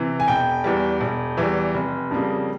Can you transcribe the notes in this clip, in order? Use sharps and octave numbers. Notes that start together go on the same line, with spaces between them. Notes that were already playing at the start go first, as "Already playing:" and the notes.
Already playing: C3 E3
G#5
E1 G5
E2 E3 G3
E1
E2 E3 G3
F1
F2 C#3 G3 A#3